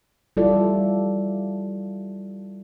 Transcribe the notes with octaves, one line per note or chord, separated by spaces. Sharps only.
G3 E4 F4 A4 D5